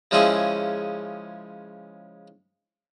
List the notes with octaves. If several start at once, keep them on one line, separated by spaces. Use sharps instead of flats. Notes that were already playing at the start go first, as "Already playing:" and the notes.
C#3 F3 G#3 C#4 E4 G#4